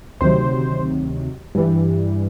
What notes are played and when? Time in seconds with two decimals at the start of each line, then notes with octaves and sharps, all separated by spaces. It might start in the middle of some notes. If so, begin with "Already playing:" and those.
0.21 D2 C3 D#3 F#3 C5
1.55 G2 E3 G3